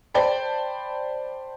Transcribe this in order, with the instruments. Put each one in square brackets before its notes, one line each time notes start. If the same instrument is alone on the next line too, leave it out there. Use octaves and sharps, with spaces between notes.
[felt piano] C5 D5 G5 A5 B5